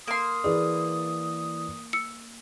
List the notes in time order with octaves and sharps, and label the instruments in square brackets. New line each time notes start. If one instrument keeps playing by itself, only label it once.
[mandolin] A#3 C6 [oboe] D#6
[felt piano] E3 B4 D5 [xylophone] G#4
[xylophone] E6 C#7